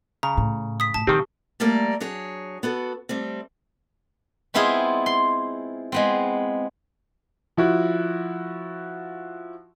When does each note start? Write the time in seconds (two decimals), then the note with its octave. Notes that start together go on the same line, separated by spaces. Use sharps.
0.23 C#3 A#5
0.37 A2
0.80 D#6 B6
0.94 A2 A5
1.07 A#2 D#3 C4 G4 C#6
1.60 G3 A3 A#3 A#4 D5
2.00 F#3 D4 G#4 C#5
2.63 B3 F#4 A4
3.09 G3 A3 C4
4.54 G#3 B3 C4 E4 F4 G#4
5.06 C6
5.92 G#3 B3 C4
7.57 F3 E4 F#4